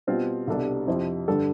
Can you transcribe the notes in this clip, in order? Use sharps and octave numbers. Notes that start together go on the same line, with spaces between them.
B2 G3 C4 F4
C2 B2 G3 D4 A4
F2 C3 F3 C4 E4
G2 D3 G3 D4 A4